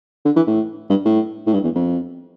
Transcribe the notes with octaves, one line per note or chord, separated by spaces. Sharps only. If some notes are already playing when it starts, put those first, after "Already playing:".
D3
E3
A2
G2
A2
A2
G2
E2
F2